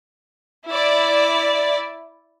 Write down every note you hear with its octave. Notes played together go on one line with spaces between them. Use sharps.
E4 D5